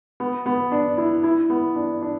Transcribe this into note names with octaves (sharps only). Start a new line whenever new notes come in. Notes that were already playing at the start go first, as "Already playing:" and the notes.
B3
B3
D4
E4
E4
B3
D4
D4